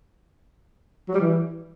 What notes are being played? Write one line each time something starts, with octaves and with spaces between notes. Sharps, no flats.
F#3
G3
E3